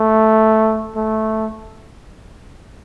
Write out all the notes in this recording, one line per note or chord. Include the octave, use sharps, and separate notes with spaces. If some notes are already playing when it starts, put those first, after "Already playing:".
Already playing: A3
A3